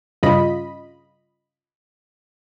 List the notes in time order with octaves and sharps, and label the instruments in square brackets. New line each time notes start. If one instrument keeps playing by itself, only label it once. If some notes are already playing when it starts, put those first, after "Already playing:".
[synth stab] G2 C#3 F4 D#5 B5